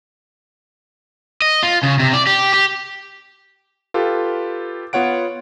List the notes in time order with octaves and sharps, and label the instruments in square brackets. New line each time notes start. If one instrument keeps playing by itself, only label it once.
[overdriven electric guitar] D#5
F4
C#3
C3
D5
G4
G4
[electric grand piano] F4 G4 A4 B4
B3 F4 C#5 F#5 D7